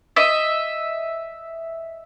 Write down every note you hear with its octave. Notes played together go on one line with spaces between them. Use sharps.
D#5 E5